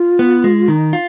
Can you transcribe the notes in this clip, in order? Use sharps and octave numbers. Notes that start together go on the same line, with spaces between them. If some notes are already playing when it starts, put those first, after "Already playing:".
Already playing: F4
B3
G#3
D#3 D#4
F4